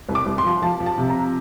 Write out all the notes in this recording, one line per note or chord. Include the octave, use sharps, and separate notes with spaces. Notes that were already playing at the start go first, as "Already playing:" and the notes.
C2
D6
C2
C6
F3
F3 A5
F3
A5
C3
A#5